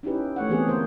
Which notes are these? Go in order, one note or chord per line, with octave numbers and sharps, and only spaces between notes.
C#4 D#4 E4 G4 B4
A3 C#5 F#5
E3 B3 C4 G4 G#4
D3 A#3 A#4 C5